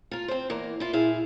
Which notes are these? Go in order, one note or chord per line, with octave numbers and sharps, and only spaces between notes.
F4 A#4
C4 C5
E2 A#3 A#4
E4 F4
A#2 E4 G#4 F5